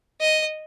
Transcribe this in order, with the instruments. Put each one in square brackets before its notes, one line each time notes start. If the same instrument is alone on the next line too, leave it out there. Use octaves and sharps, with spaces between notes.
[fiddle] D#5